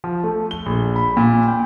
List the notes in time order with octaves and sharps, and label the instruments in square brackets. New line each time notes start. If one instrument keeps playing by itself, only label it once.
[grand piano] F3
A3
G7
A#1
B5
A#2
G5